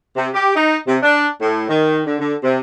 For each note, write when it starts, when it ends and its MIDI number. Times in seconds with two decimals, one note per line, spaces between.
0.16 0.27 48
0.34 0.53 67
0.56 0.77 63
0.87 0.97 48
1.02 1.26 62
1.41 1.67 45
1.69 2.01 51
2.07 2.18 50
2.19 2.35 50
2.43 2.58 48